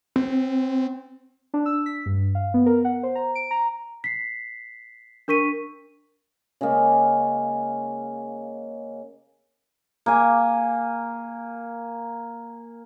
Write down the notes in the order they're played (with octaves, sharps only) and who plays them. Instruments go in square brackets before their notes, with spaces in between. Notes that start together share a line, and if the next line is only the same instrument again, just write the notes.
[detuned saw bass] C4
[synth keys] D4
E6
B6
G2
F5
B3
A#4
F#5
C5
A#5
D7
A#5
[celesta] B6 C7
D4 A#4 C#6 B6 D#7
[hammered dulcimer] C#3 G#3 A#3
A#3 G#5